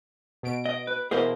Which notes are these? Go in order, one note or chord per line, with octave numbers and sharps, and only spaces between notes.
B2 D7
D#5
B4
B2 E3 A#3 G#4 A#4 C5